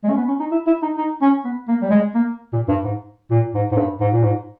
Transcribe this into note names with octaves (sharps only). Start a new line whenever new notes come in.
G#3
C#4
B3
C#4
D#4
E4
E4
D#4
D#4
C#4
B3
A#3
G3
G#3
A#3
A#2
G2
G#2
A#2
G#2
G#2
G2
G#2
A#2
G#2